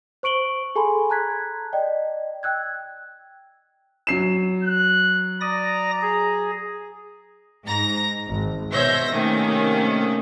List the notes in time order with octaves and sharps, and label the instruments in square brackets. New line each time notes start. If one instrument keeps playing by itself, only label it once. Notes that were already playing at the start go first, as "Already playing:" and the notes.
[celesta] C5 C#6 D7 F#7 G7
G#4 A4 G#5 A5 B5 C6
A5 A#5 F#6 G#6 B6
D5 D#5 G5
G5 E6 F#6 G#6
[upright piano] F#3 C7 E7
[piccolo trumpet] F#6
[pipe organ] D5 D#6 A#6 [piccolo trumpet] A#5
[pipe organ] G#4
[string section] G#2 A#5 A#6
G#1
B2 C5 C#5 E5 G6 A#6
C3 D#3 A3 A#3 C#4